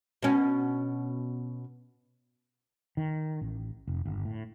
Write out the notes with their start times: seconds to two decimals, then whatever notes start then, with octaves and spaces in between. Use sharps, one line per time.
0.23 B2 C#4
2.97 D#3
3.41 A1
3.87 F1
4.05 G1
4.25 A2